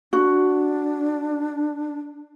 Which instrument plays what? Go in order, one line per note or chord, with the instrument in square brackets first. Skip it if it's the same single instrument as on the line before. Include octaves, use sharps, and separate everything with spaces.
[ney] D4 [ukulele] F#4